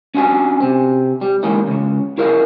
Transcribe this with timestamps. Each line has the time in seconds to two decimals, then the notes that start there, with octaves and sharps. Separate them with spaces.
0.15 C#4 D4 F#4 D5 D#5 G#5
0.60 C3 C4
1.21 G3
1.43 D3 E3 G#3 A#3 C#4 D#4
1.68 C#2 C#3
2.18 E4 G#4 A#4 D#5 F5